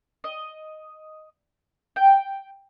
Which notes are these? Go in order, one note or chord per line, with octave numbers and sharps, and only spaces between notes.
D#5
G5